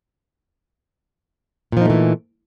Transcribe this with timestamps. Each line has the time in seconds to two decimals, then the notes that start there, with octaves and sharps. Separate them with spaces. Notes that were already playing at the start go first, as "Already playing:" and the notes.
1.72 A#2
1.77 F3
1.81 D#4
1.85 A3
1.90 E3